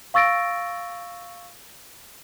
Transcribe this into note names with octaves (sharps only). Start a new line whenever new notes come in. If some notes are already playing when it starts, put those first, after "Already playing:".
F5 C#6 E6 A6 A#6 D7